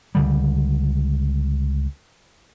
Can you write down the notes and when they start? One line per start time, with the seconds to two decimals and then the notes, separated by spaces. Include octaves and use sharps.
0.15 C#2 D3 G3